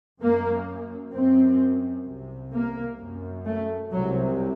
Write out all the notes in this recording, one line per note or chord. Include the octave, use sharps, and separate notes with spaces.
F#2 A#3
F#2 C4
C2 C3
A#3
F#2
A3
C2 C3 F#3